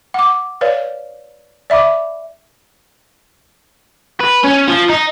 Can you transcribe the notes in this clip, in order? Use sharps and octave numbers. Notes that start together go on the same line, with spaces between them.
F#5 D6
B4 C#5 D5 F5
D5 E5 B5 D6
B4
C#4
F3
D#4